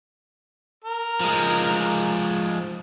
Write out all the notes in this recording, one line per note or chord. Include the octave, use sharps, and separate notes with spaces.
A#4
F3 G#3